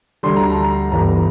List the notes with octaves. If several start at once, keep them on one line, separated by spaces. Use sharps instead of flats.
D2 D3 G3 C6
A#5
A5
A#5
G1 G2 E3 G3 A#5